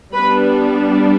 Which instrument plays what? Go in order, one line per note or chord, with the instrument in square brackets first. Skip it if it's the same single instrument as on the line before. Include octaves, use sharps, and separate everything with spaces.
[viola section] G3 B3 D4 B4 B5